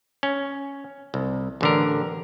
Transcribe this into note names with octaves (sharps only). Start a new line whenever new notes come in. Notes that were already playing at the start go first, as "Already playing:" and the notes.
C#4
C2
A1 D3 A#4